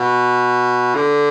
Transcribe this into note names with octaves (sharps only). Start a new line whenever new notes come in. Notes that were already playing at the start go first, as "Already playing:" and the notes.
Already playing: B2
D3